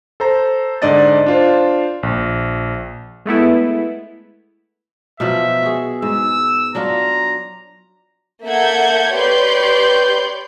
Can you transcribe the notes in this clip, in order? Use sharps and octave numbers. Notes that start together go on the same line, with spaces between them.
A4 C5 A#5
G#2 D3 D4 D5 D#5 A6
D4 F4 C5
A#1
G#3 A3 B3 E4
B2 F3 F#3 E5
F#4 G#4
G#2 E6
F#3 D4 F4 A#5
A#3 A4 E5 F#5 G6 G#6
G4 B4 C#5 D5 C6 G6